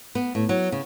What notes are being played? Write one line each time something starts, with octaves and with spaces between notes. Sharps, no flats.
B3
A2
F#3
C#3